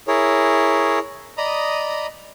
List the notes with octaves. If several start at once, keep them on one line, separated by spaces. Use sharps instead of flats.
E4 G#4 A#4 C#5
D5 D#5 A#5 B5 D#6